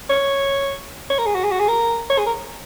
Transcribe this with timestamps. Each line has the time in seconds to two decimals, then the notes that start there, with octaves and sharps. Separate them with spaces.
0.10 C#5
1.10 C#5
1.19 A#4
1.26 G#4
1.35 F#4
1.44 G#4
1.51 F#4
1.59 G#4
1.68 A#4
2.10 C#5
2.18 G#4
2.26 A#4